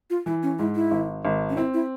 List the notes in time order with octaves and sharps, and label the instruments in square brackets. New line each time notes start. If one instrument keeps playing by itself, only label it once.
[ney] F4
[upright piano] E3 [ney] E4
[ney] C#4
[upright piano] G#2 [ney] E4
[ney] E4
[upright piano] G#1
G#1
[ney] C#4
[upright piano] C4 [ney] E4
[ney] E4